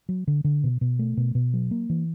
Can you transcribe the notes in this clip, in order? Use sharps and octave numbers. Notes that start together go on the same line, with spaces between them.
F#3
D3
D3
B2
B2
A3
B2
B2
F#3
A#3
E3